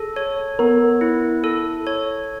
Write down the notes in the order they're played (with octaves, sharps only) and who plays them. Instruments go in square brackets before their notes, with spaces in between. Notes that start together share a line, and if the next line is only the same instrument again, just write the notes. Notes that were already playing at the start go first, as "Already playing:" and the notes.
Already playing: [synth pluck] G#4 [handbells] A4
[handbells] C#5
[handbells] B3 [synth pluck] A#4
[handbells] E4
A4
C#5